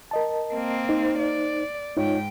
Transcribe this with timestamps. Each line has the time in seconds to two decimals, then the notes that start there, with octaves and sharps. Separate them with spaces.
0.11 A#4 D#5 A5
0.54 A#3 C4
0.89 D#4 C5
1.18 D5
1.97 G#2 D#4 F4 C#5 G5